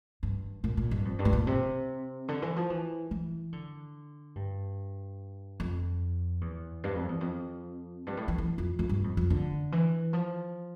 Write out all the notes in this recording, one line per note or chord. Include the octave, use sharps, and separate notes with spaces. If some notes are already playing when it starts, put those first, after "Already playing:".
G2
A#2
A#2
G2
F2
G2
A2
A#2
C3
D3
E3
F3
E3
E3
D3
G2
F2
E2
G2
F2
E2
F2
G2
A2
E3
E3
F2
F2
G2
F2
F2
D3
E3
F3